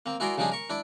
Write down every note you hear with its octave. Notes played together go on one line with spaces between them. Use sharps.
A#3 C4
E4 F#4 G#4 A#4 D5 C6
C#3 F3 G3 D4 D#4 G#4
A#4 C#6
D4 E4 D5